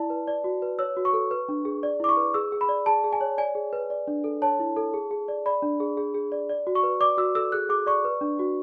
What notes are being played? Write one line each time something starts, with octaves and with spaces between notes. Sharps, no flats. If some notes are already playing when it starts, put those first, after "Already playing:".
Already playing: E4 D5 A5
B4
D5
F#4
B4
C#5 E6
F#4
C#6
A4
B4
D4
G#4
D5
E4 D6
C#6
B4
G#4 E6
G#4
B5
D5
G#4 A5
G#4
G#5
C#5
D5 G#5
G#4
B4
D5
D4
A4
C#5 A5
E4
A4
G#4
G#4
D5
D5 B5
D4
G#4
G#4
G#4
D5
D5
F#4
C#6
B4
D5 D6
F#4 E6
A4 E6
G#4 F#6
G#4 D6
D5 C#6
B4
D4
F#4